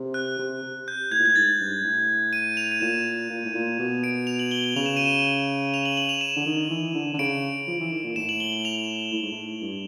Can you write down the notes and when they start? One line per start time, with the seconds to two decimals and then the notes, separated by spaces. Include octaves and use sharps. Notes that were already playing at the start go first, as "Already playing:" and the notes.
Already playing: C3
0.14 F#6
0.39 C3
0.63 C3
0.88 G6
1.11 A2 G#6
1.20 A#2
1.26 A2 G#6
1.36 G#2 A6
1.60 G2
1.84 A2
2.33 D#7
2.57 F7
2.72 D#7
2.81 A#2 E7
3.30 A#2
3.45 A2
3.54 A#2
3.79 B2
4.04 D7
4.27 F7
4.39 F#7
4.51 G7
4.64 F#7
4.76 C#3 F7
4.86 E7
4.97 D#7
5.06 E7
5.74 F7
5.85 F#7
5.97 F#7
6.09 F7
6.21 E7
6.36 D3
6.46 D#3
6.70 E3
6.95 D3
7.14 D3
7.19 C#3 D7
7.67 F3
7.80 E3
7.92 D#3
8.04 A#2
8.16 A2 E7
8.29 F#7
8.40 G7
8.53 F#7
8.65 F7
9.13 A2
9.23 G#2
9.32 A2
9.62 G2